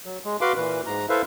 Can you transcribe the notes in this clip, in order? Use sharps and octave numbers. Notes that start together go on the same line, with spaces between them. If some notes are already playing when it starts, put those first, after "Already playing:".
F#3
G#3
F#4 B4 F5 B5 C6 D6
A#2 E3 B4
G#2 A#5
E4 A4 B4 C5 E5 F5